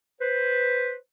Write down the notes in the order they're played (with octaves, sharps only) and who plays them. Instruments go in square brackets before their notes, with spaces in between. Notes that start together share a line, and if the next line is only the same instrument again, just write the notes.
[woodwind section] B4 C5